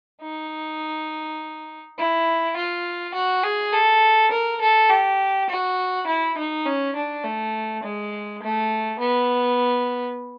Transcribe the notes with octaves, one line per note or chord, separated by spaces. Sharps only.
D#4
E4
F4
F#4
G#4
A4
A#4
A4
G4
F#4
E4
D#4
C#4
D4
A3
G#3
A3
B3